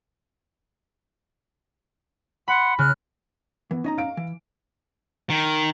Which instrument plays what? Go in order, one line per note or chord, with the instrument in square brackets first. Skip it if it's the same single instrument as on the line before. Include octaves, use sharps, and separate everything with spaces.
[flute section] F#5 C6 [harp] B5
[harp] C#3 [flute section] F6 F#6
[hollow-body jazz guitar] E3 [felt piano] B3
[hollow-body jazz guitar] C#4 D#5 A#5 [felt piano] D#4
[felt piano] F5 D7
[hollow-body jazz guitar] E3
[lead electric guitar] D#3